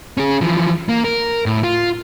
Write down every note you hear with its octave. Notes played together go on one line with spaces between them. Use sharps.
C#4 G#4
E3 F3
A#3
A#4
A2
F4